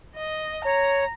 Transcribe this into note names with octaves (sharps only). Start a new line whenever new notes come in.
D#5
C#5 A#5